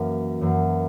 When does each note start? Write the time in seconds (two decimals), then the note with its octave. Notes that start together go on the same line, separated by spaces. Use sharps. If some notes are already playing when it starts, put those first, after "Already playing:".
Already playing: F#2 E3 A#3
0.41 F#2 E3 A#3